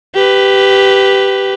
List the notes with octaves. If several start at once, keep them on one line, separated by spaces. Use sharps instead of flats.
G4 B4